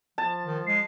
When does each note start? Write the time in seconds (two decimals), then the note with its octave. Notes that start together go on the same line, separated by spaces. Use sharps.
0.18 F3 A5
0.45 D#3
0.67 G#3 C7